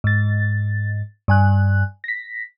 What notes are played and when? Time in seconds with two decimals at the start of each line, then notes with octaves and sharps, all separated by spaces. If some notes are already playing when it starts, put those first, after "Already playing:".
0.04 G#2 A6
1.28 G2 G#5 F#6
2.04 A#6 B6